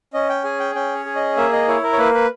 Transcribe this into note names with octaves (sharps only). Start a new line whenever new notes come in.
C#4 D#5
G5
G#4 G#5
G5
C#4 G5
C#5
G#4
D#5
A#3 E5
D#5
E4 C#5
A#4
C#5
A#3 B4
B4